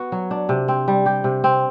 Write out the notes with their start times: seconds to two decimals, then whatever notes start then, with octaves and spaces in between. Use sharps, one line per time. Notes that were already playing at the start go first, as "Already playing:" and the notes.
Already playing: B3 F#4
0.12 F#3
0.31 D4
0.49 C3
0.68 C4
0.88 G3
1.06 G4
1.24 C3
1.44 C4